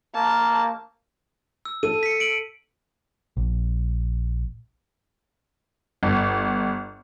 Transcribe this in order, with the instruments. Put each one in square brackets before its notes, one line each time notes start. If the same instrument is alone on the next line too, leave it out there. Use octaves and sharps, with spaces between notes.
[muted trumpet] A#3 [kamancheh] A5
[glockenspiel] E6
[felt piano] A4 [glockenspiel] D#7
[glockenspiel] B6 C#7
D7 F#7
[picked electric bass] A#1
[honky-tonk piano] G1